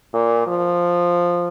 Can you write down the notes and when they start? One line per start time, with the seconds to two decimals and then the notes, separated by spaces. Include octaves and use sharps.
0.14 A#2
0.47 F3